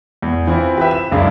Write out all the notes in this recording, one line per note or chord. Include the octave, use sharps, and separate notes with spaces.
E2
E3 C4 E4 F4
G4 B4 E5
E7
C#2 F#2 D4 E4 G#4 F5